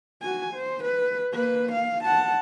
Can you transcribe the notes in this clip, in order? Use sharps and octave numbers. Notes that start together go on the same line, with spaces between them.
F#4 G#5
C5
B4
A#3 B4
F5
F#5 A5